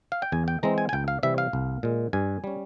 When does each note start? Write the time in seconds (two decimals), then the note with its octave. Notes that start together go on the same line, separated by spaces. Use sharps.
0.12 F5
0.22 G5
0.32 E2 G#5
0.48 G5
0.63 E3 G#3 C4 A#5
0.78 G#5
0.89 G#5
0.93 C#2 G5
1.08 F5
1.23 C3 E3 G3 E5
1.38 F5
1.53 C2
1.83 A#2 G#3
2.13 G2 G#5
2.44 G3 C#4